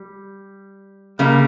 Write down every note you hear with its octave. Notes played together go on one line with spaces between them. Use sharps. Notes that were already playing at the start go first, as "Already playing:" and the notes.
Already playing: G3
C#3 G3 A#3